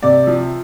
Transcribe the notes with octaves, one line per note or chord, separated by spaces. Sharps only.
C3 D5
F3